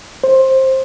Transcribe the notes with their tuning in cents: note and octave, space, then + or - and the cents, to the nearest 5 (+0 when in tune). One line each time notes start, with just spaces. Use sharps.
C5 +15